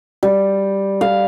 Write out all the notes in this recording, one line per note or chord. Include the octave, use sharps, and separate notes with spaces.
G3
F5